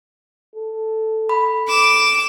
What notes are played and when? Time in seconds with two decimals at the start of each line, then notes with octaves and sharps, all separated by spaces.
0.55 A4
1.29 B5
1.68 D6 E7